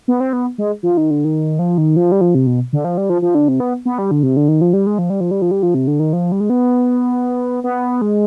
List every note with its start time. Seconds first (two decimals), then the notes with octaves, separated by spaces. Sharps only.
0.08 B3
0.20 C4
0.33 B3
0.58 G#3
0.83 F3
0.97 D#3
1.11 D3
1.25 D#3
1.59 F3
1.78 D#3
1.96 F3
2.12 G3
2.21 F3
2.35 C3
2.47 B2
2.73 D3
2.84 F3
2.98 G3
3.10 F3
3.22 F3
3.35 D3
3.48 C3
3.60 B3
3.85 B3
3.98 G3
4.11 D3
4.23 C3
4.37 D3
4.48 D#3
4.61 F3
4.73 G3
4.87 G#3
4.98 F3
5.10 G3
5.20 F3
5.31 G3
5.42 F3
5.51 G3
5.63 F3
5.74 C3
5.87 D3
6.00 D#3
6.13 F3
6.32 G3
6.40 G#3
6.50 B3
7.64 B3
8.02 G#3